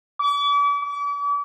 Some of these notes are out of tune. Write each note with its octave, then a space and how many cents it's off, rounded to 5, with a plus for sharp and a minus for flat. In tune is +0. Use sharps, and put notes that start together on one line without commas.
D6 -40
D6 -40